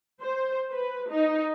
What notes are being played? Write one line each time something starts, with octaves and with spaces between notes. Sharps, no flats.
C5
B4
D#4